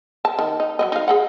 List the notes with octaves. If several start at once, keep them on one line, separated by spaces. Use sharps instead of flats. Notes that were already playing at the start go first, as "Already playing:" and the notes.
A5
D#3
D#4
F#3 B3 D#5
D#4 F5
G#4 D#5 F#5